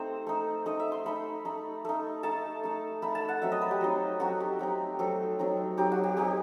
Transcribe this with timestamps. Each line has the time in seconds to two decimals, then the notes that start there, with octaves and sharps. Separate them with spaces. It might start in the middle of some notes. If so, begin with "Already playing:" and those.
Already playing: A3 C4 D#4 C5
0.27 A3 D#4
0.66 A3 D#4 D#5
0.80 E5
0.92 C6
1.06 A3 D#4 B5
1.45 A3 D#4
1.85 A3 D#4
2.23 A3 D#4 A5
2.63 A3 D#4
3.02 A3 D#4 B5
3.15 A5
3.28 F#5
3.42 F#3 C4 D#4 E5
3.52 D#5
3.61 B4
3.71 G4
3.81 F#3 C4 D#4
4.20 F#3 C4 D#4 F#4
4.40 G4
4.59 F#3 C4 D#4
4.99 F#3 C4 D#4 A4
5.39 F#3 C4 D#4
5.77 F#3 C4 D#4 G4
5.92 F#4
6.04 G4
6.17 F#3 C4 D#4 G4